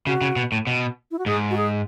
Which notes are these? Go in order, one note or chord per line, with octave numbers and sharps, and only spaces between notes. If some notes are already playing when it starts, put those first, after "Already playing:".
C#3 F#4
C#3
B2
A2
B2
E4
F#4
G#2 G#4
F#4
G#4